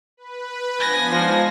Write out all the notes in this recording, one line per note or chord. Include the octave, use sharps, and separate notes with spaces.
B4
F3 B3 D4 G#5 A#6
F3 G#3 D#4